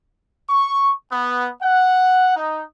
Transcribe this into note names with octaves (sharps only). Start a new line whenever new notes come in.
C#6
B3
F#5
D#4